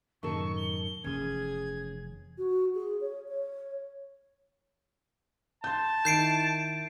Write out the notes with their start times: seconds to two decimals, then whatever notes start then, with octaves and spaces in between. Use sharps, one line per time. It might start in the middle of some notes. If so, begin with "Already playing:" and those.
0.23 F#2 A2 C3 D#3 A4 C#6
0.57 G7
1.04 F1 E3 C#4 G#4 G#6
2.38 F#4
2.75 G#4
3.01 C#5
3.28 C#5
5.64 A5 C6 G6
6.05 D#3 E4 G6 C7 D7